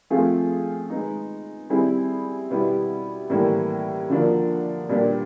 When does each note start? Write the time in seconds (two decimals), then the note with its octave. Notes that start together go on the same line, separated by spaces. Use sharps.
0.10 F3 A3 C4 F4 G#4
0.90 G#3 B3 D#4
1.70 G3 C4 E4 G#4
2.50 B2 G3 B3 E4 G4
3.30 A2 E3 G3 A#3
4.10 D3 F3 A#3 D4
4.89 A#2 G3 B3 D4 G4